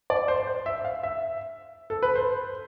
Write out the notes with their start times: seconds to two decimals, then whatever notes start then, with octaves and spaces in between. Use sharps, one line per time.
0.10 D5
0.28 C5
0.47 C5
0.66 E5
0.85 F5
1.03 E5
1.90 A4
2.03 B4
2.15 C5